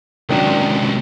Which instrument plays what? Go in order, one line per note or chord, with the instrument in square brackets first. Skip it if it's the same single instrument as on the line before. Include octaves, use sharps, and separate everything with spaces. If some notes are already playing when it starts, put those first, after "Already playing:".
[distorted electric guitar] C#2 C3 [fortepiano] D#3 F#3 D4